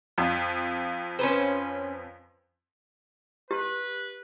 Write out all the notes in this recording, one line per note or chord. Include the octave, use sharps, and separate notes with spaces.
F2 F3
C#4 B4 C5
G4 B4